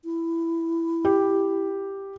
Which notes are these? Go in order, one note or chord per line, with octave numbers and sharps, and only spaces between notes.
E4
G4